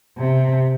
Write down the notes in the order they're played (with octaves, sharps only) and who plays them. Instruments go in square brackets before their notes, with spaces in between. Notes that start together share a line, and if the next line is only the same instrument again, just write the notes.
[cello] C3